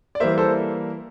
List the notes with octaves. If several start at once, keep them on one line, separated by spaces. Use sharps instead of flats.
D5
E3 G3 A#3 C5 E5
A4 C5